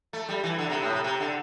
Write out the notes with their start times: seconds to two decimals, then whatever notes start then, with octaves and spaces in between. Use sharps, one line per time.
0.13 A3
0.29 G3
0.43 E3
0.58 D3
0.70 C3
0.82 A2
0.93 C3
1.04 C3
1.20 D3